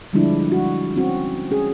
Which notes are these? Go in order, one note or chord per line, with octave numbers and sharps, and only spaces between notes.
D3 F3 G3 G#3 D4 E4
F#4
C4 C#4 F#4
C#4 G#4